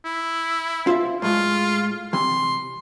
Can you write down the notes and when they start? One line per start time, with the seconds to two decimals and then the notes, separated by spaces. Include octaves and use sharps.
0.05 E4
0.87 F4 C5 E5
1.22 A2 G#3 F4
2.13 C3 E3 C6